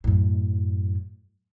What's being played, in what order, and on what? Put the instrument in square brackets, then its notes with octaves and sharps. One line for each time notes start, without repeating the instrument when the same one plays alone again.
[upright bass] F#2 A2